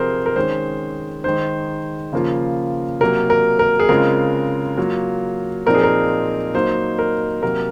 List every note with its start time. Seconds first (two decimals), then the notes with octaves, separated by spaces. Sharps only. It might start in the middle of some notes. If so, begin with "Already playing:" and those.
Already playing: C3 F3 C4 G#4 A#4 C5
0.26 A#4
0.36 D#3 G#3 C#4 C5
1.24 D#3 G#3 D#4 C5
2.13 C#3 F3 A#3 F4
3.01 C3 F#3 A#3 A#4
3.30 A#4
3.59 A#4
3.80 G#4
3.89 C#3 G#3 C4 F4 A#4
4.77 F#3 A#3 F4
5.66 A#2 F3 C4 D#4 A#4
5.75 G#4
5.83 A#4
6.54 F#3 A#3 D#4 C5
6.99 A#4
7.42 C3 F#3 A#3 A#4